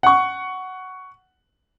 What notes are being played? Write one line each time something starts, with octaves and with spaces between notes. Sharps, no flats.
F#5 C#6